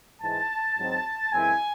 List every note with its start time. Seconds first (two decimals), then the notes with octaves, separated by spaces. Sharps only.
0.22 G#2 E3 G#3 A5
0.77 G#2 F#3 C4 D#4
1.33 F#2 E3 G#3 C4 E4 G#5